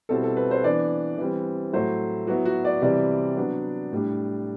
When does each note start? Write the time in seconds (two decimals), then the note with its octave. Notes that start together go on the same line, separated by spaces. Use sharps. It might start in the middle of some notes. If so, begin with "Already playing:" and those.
0.09 B2 G3 C4 E4 A4
0.24 A4
0.36 B4
0.51 C5
0.64 E3 B3 D4 D5
1.18 E3 G3 C4
1.73 A2 F#3 A3 E4 C5
2.27 F#3 B3 E4 F#4
2.45 F#4
2.65 D5
2.82 C3 E3 G3 C4 E4 D5
3.36 F#3 B3 D4
3.92 A2 G3 D4